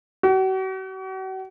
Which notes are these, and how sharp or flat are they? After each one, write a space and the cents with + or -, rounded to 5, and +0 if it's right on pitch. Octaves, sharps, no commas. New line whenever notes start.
F#4 +40